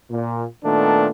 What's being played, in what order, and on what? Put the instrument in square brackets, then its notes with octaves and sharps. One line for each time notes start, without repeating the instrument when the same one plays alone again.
[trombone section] A#2
A#2 D#3 A3 B3 D4 A4